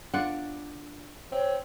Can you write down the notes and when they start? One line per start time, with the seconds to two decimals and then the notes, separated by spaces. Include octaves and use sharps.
0.14 D4 F4 D5 F#5
1.32 C4 C#5